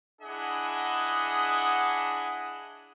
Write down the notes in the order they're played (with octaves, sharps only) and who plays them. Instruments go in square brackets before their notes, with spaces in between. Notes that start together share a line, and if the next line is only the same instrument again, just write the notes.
[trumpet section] D4 E4 G#4 D#5 F#5 D#6